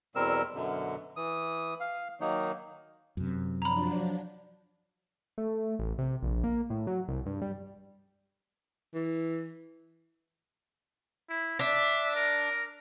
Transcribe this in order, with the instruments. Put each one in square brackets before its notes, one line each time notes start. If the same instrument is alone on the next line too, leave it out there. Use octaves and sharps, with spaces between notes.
[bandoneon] E2 B2 G3 C4 A#4 E6
F#2 B2 D3
E3 D#6
F5
D#3 F#3 A#3 D#4
[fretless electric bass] F#2 C3
[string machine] F3 F#3 D4 [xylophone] A#5 B5
[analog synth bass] A3
A1
C3
A#1
A#3
A2
F#3
C2
G2
G3
[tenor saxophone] E3
[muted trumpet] E4
[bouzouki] D4 [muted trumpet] E5
[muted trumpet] A#4